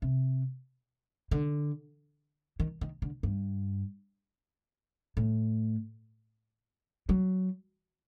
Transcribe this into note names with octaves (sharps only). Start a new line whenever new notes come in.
C3
D3
D#3
D#3
D3
G2
A2
F#3